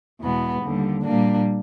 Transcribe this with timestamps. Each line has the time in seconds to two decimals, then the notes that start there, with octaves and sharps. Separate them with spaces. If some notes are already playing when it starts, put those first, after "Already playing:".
0.20 E2 B2 G#3 B3
0.62 D#2 D3 G3
1.03 A#2 G3 A#3 D4